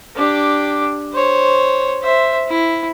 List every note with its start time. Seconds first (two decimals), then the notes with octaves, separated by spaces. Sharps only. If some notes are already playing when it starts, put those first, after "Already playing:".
0.16 D4 G4
1.13 C5 C#5
2.02 C5 E5
2.48 E4